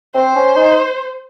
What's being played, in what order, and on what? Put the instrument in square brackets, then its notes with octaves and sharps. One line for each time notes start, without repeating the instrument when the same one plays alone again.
[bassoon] C4 [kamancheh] C5
[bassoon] C#4
D#4